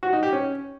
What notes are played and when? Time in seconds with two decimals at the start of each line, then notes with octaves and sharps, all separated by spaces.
0.03 F#4
0.13 D#4
0.23 G4
0.33 C#4